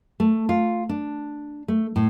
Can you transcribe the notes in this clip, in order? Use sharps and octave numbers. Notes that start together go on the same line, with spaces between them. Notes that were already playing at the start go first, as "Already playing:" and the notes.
A3
F4
D4
A3
A2